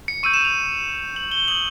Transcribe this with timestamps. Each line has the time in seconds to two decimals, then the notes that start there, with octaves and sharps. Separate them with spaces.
0.08 C#7
0.23 C#6 E6 G6 D#7
0.34 E7
0.45 F7
1.16 F#7
1.32 G7
1.48 D#6 G6 F#7